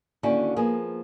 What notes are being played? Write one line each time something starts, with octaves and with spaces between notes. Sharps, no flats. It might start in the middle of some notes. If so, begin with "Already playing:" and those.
D#2 D3 C#4 D4 E4 F#4
F3 A#3 B3 G#4